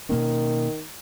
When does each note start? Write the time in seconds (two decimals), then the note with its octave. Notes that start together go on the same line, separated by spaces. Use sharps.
0.09 B2 D#3 A#3 C#4